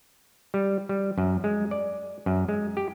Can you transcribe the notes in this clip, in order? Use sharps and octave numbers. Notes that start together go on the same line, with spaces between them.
G3
G3
F#2
G#3
D5
F#2
G#3
G4